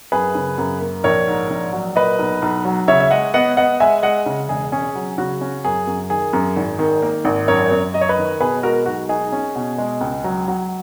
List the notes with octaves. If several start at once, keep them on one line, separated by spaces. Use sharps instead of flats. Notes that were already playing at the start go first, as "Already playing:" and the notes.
F#2 G#4 B4
C#3
F#2
A#3
A#1 A#4 C#5
G#2
A#1
F#3
A#2 B4 D#5
B1
B1
F#3
C#3 C#5 E5
E5
G#3 D#5 F#5
B3 D#5 F#5
B3 D#5 F#5
G#3 E5 G#5
G#3 D#5 F#5
C#3
E1 G#4
C#4 G#4
F#3
C#3 F#4
C#4
F#2 G#4
F#2
D#3 G#4
F#2
G#1
D#3
A#3
G#1
F#2 A#4 C#5
F#2
F#2 D#5
C#5
B4 D#5
D#3
B2 G#4 B4
G#3 F#4 A#4
B1 F#4
D#4 G#4
C#4
B2
G#3
C#2
F#3
F#3